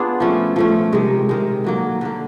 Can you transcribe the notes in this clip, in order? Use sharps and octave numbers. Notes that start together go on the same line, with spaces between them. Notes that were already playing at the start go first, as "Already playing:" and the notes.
Already playing: B3 D4 F4 G#4
F3 A3 C#4
F3 A3 C#4
C3 D#3 G#3
C3 D#3 G#3
D3 F#3 A#3
D3 F#3 A#3